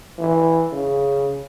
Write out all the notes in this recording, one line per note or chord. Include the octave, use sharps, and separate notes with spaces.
E3
C#3